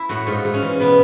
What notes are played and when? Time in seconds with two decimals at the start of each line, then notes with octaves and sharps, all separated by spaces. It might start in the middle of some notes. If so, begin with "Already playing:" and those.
Already playing: E4
0.09 A2 F#4
0.27 G#2 F4
0.45 G#2
0.54 C#4
0.62 E3
0.80 B2 B3